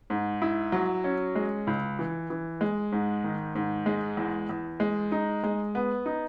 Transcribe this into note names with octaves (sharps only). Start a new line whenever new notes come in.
G#2
E4
F#3
C#4
G#3
C#2
E3
E3
G#3
G#2
D#3
G#2
G#3
E2
E2
G#3
D#4
G#3
B3
D#4